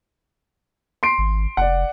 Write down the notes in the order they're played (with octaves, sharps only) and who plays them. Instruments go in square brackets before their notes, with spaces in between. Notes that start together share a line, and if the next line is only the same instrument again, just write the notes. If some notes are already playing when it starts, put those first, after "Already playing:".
[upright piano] C6 C7 D7
[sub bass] G#1
[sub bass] F1 [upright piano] D5 F#5